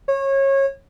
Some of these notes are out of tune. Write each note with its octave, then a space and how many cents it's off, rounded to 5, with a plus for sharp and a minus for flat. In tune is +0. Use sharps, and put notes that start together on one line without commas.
C#5 -25